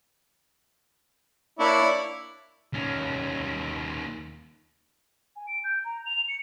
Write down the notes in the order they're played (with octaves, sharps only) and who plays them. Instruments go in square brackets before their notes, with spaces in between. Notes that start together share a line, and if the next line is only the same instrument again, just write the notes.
[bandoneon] A#3 D4 [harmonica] E4 C#5 D5
[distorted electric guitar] D#2 C#4
[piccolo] G#5
D7
G6
A#5
F7
C#7